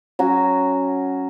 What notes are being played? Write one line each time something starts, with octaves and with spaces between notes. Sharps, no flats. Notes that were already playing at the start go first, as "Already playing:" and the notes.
F#3 C#4 F#4